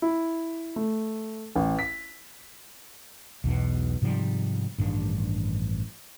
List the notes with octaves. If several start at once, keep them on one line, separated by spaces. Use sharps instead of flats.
E4
A3
A1
B6
B1 E2 B2 F#3
G#2 C3 F3 G3
A1 G2 D#3 D4